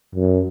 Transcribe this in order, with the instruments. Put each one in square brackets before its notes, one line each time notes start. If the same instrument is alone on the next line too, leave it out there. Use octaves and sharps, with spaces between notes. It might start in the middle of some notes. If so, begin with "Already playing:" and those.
[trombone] F#2